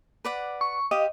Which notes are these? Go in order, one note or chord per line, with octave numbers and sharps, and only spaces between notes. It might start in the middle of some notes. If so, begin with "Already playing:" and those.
B4 D5 F#5
C#6
G4 C5 D#5 F5